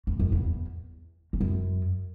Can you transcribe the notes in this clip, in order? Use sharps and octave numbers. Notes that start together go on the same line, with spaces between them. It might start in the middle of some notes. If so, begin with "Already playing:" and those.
E2
F#2
E2
E2
F#2